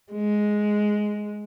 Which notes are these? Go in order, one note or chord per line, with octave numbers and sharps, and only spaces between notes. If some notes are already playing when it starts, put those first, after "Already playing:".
G#3